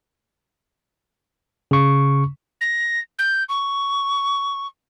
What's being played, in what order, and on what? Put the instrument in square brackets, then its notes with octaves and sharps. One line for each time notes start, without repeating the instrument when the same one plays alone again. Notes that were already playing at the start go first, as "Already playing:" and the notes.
[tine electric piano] C#3 C#6
[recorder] A#6
G6
C#6